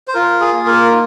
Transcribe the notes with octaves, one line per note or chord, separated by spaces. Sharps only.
C5
F4 A#4
G#4
A#3
A#4
D#4